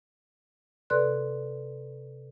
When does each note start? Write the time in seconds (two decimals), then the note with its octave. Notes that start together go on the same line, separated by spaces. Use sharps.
0.90 C3 A4 B4 D5 C6 F#6